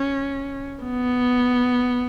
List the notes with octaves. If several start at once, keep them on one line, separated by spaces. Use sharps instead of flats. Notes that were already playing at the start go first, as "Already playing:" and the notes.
Already playing: C#4
B3